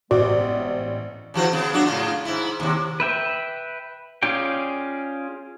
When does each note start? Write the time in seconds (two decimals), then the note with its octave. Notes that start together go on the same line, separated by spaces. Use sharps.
0.11 A1 C3 G#3 B3 F#4 D5
1.34 C#3 E3 F#4
1.52 C#3 B3
1.73 F#3 D4 F#4
1.86 A2 C#3 F4
2.25 G#2 E4
2.60 D#2 C3
3.00 B4 E5 G5
4.23 C#4 F4 G#4 D5 G5